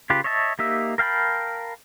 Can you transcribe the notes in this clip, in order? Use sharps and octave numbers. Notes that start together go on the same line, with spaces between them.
C#3 F4 G4 B4
C#5 D#5 E5 A5
A#3 D#4 G4 E5 E6
A#4 F5 G5 A5 B5